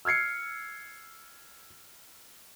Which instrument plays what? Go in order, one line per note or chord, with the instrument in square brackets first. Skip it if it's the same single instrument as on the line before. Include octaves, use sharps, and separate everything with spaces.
[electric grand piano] E6 F6 G#6 C7 C#7